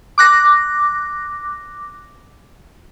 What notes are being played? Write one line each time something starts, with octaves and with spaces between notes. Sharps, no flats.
D6 F#6 A#6